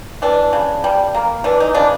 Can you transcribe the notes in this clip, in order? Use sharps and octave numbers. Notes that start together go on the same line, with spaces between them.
E3 D4
C#3
G3
A#3
E3 D4
D#4
C#3 D4